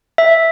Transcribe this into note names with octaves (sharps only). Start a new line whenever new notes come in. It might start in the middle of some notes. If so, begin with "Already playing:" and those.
E5